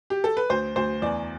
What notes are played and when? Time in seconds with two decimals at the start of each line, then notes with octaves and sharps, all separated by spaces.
0.10 G4
0.24 A4
0.37 B4
0.50 D2 C5
0.76 D2 C5
1.02 E2 D5